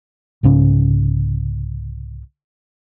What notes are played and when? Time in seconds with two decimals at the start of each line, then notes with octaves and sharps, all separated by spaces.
0.43 C2 G#2 C#3 C#4